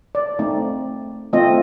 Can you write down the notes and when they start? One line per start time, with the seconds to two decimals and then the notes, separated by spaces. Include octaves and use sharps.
0.15 D5
0.39 A3 C4 D#4
1.33 A3 C4 F4 D#5